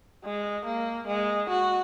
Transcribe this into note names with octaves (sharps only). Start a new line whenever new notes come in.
G#3
A#3
G#3
F#4